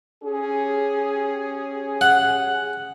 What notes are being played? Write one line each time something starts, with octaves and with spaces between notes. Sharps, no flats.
C#4 G4 G#4
F#5